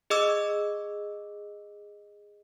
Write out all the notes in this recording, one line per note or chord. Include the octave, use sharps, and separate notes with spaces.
G#4 D#5 D6 E6